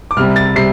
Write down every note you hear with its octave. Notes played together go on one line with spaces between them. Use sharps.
D6
C2 C3 G3 F6
A6
C3 G3 C7